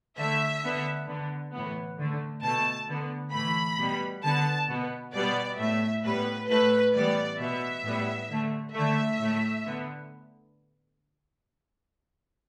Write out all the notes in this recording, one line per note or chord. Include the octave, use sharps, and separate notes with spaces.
D3 A3 E5
D3 B3
D3 B3
A2 E3 B3
D3 A3
B2 A3 A5
D3 B3
A2 E3 A3 B5
B2 G3 B3
D3 B3 A5
B2 B3
B2 G3 B3 D5
A2 A3 E5
A2 G3 B3 B4
A2 A3 B4
A2 E3 G3 B3 D5
B2 B3 E5
A2 G3 B3
D3 A3
D3 A3 E5
A2 A3
D3 B3